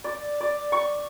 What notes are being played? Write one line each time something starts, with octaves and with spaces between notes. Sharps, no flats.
D5
D5
C#6